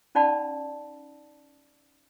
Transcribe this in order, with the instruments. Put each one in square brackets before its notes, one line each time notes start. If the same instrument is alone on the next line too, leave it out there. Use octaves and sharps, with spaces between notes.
[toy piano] C#4 D#4 D5 F#5 A5 B5